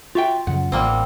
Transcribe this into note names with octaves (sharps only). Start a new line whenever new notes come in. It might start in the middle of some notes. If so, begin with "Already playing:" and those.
F4 F#4 E5 G5
F#2 C#3 F#3 F#5
A1 G3 A#3 C4